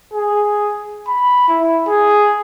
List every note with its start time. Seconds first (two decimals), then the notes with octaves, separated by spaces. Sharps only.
0.14 G#4
1.08 B5
1.49 E4
1.88 G#4